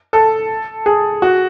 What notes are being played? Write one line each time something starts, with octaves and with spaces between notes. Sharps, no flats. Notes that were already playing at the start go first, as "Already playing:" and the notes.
A4
G#4
F#4